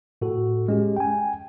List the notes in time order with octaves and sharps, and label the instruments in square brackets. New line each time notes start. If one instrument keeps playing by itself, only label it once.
[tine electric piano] A2 F#4 A4
G#3 C#4 G4
G5 G#5